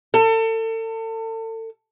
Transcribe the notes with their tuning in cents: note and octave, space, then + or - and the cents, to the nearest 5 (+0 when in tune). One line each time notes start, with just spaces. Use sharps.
A4 +35